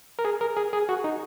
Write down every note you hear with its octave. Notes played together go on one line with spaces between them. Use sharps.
A#4
G#4
A#4
G#4
G#4
F#4
D#4